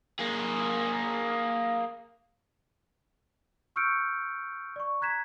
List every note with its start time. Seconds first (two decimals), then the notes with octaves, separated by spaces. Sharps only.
0.19 A#3 G#4
3.76 C#6 E6 F6 G6 C#7 D7
4.76 D5 C#6
5.01 A#5 F#6 G#6 B6 E7